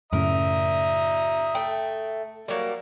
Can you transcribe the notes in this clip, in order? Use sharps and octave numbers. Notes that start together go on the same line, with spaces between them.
F#2 A2 C#3 A#4 E5 A#5 D#6
A3 G5
F#3 G3 A#3